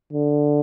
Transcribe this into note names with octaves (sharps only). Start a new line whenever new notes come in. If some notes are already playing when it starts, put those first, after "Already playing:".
D3